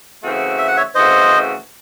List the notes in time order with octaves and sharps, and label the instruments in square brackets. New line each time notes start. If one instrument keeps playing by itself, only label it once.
[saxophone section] C#3 E3 A3 C4 F#4
[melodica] E5
F#5
C#5 E5
[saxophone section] C#3 E3 A3 C4 F#4 [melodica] C5 D#5